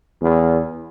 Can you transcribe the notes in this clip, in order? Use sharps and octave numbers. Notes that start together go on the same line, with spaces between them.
E2